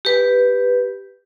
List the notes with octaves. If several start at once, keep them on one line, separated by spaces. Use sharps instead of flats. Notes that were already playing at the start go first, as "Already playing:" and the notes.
G4 B4